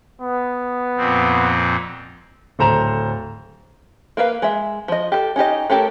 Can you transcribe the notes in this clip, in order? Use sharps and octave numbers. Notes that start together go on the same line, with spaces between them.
B3
F2 A#2 C4
D1 A4 C5 A#5 E7 F7
A#3 A#4 B4 F5
G#3 E5
F3 D#5
G4 A4
C#4 D#4 G4 D#5
A3 C#4 G4 A4 A#4